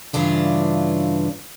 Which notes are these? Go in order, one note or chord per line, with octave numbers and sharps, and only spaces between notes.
G2 C#3 E3 D4 F4